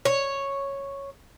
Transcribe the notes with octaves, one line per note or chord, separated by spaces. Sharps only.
C#5